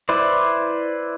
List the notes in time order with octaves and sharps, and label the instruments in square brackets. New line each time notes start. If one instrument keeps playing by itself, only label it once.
[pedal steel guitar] E4 B4 C5 D5